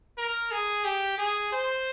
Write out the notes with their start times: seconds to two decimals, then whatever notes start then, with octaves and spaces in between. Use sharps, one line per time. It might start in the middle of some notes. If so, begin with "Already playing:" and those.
0.18 A#4
0.51 G#4
0.85 G4
1.18 G#4
1.52 C5